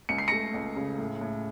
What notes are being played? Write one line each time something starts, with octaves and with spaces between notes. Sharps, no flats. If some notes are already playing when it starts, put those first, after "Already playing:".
C#2 C#7
C7
A3 A#6 C#7
C#2
C#3
A2
A2